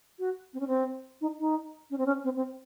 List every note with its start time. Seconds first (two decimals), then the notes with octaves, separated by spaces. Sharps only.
0.19 F#4
0.54 C4
0.60 C#4
0.67 C4
1.21 D#4
1.39 D#4
1.91 C#4
1.98 C4
2.06 C#4
2.24 C4
2.36 C4